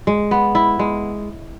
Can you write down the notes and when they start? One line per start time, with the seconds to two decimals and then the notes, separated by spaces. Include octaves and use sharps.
0.07 G#3
0.31 B3
0.55 E4
0.79 G#3